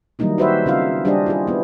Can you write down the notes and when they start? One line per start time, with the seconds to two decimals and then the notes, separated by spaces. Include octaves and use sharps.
0.19 D#3 F#3 G3 A#3 D#4 E4
0.38 F#4 G4 B4 C5 D#5 E5
0.66 C#3 C4 D#4 F4 E5 F5
1.05 G3 D4 G4 G#4 C5 D#5
1.26 E4 F4 G#4
1.47 B3 E4